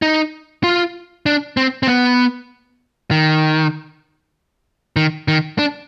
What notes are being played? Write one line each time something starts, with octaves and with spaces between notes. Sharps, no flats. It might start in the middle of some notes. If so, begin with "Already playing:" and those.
D#4
F4
D4
C4
C4
B3
D#3
D#3
D#3
D4